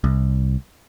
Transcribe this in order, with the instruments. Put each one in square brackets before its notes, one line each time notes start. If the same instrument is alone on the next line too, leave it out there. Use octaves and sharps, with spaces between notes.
[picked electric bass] C2